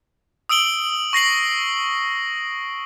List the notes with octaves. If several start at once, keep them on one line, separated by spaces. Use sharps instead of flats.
D#6 E6 D7 F#7 G7
C#6 A#6 C7 F#7